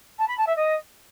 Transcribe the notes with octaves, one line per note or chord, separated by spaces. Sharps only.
A5
B5
A5
E5
D#5